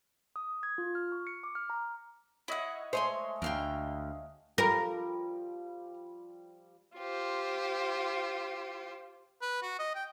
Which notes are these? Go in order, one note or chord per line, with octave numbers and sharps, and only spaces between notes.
D#6
G#6
F4
F6
C#6
C#7
D6
F6
A#5
E4 C#5 D#5 E5 F#5
G#3 A3 C5 C#5 G#5 C6
D2 A#4 F5 G5
F3 G3 A#4
F4 G4 C5
B4
F#4
D#5
G5